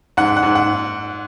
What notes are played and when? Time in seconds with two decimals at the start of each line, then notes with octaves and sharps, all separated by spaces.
0.17 G#2 F#5
0.37 F#5
0.43 G#2
0.55 F#5